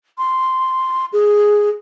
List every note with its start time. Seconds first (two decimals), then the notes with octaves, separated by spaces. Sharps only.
0.18 C6
1.13 G#4